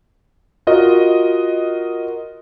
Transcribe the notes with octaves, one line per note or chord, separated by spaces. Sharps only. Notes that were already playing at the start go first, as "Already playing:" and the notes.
F4 F#4 A#4 D#5